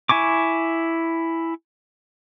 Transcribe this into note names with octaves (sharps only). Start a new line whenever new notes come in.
E4 G#5 C#6 D6